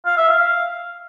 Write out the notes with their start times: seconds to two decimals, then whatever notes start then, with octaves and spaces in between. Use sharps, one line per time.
0.06 F5
0.17 E5
0.29 F5